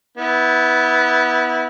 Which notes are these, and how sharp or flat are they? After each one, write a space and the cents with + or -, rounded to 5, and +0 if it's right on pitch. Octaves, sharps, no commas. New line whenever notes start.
B3 +0 E4 -25